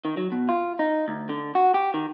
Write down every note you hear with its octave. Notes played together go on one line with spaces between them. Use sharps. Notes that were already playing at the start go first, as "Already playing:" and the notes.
D#3
F#3
B2
F4
D#4
D2
D3
F#4
G4
D#3